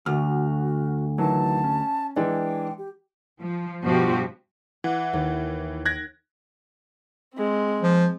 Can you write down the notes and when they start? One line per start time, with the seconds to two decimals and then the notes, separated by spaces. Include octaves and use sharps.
0.06 D2 F#4 F6
1.18 D#3 E3 F#3 A5
1.64 C#4
2.16 E3 G#3 D4 G5
2.78 G4
3.41 F3
3.83 G2 B2 F3 F#4 G4
4.84 E3 F#5 D6
5.13 D#2
5.85 F#6 G#6 A#6 D7
7.35 G#3 C4
7.82 F3